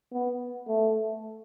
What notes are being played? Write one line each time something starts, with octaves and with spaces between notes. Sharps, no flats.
B3
A3